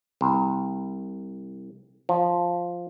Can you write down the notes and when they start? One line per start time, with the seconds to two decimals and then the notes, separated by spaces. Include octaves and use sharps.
0.21 C2
2.09 F3